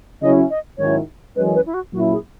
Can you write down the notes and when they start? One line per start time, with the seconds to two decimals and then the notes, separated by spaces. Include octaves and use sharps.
0.22 C#3 F#3 C#4 E4 D#5
0.50 D#5
0.78 G#2 D#3 F#3 C#4 E4 C#5
1.36 F#2 E3 G#3 C#4 B4
1.55 B4
1.66 E4
1.74 F#4
1.93 A#2 F#3 A#3 C#4 E4 F#4
2.12 G#4